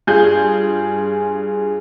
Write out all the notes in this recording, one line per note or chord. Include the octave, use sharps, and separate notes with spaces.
G2 F4 G#4 G6